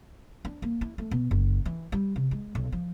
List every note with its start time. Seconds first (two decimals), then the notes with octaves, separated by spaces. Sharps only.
0.45 D4
0.62 A#3
0.81 E4
0.98 A3
1.11 B2
1.31 F#1
1.66 E3
1.92 G3
2.16 C3
2.31 G#3
2.55 B1
2.72 F3